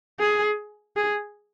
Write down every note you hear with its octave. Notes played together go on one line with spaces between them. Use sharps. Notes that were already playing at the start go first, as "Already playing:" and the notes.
G#4
G#4